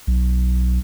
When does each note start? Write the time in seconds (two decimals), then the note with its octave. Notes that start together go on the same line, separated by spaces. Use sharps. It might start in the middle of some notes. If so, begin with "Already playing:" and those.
0.07 B1